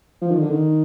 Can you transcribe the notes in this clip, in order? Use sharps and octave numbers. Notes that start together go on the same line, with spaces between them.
F3
D#3
D3
D#3